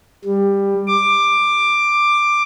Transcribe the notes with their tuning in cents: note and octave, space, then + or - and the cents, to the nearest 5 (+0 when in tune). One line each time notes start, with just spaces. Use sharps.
G3 +15
D6 +10